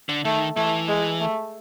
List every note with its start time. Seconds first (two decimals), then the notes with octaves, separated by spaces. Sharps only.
0.09 D3
0.25 D#3 A3
0.56 E3 A3
0.88 G#3
1.21 A3